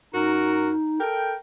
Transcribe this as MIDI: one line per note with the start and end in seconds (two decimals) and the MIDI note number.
0.14 0.72 42
0.14 0.99 63
0.14 0.72 66
0.14 0.72 70
1.00 1.36 69
1.00 1.36 70
1.00 1.36 79